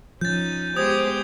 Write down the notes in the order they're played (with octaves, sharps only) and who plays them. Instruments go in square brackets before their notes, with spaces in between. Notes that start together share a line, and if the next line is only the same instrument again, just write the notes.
[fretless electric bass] F3 [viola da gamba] C#4 D#4 [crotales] G6 A6
[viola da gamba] G#3 B3 G4 [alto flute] C5 [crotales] D#6 G#6